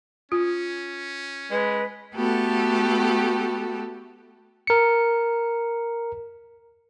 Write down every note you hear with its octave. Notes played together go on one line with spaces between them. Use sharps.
C#4 F4
G#3 B4
A3 B3 F#4 G4 A4
A#4 C#7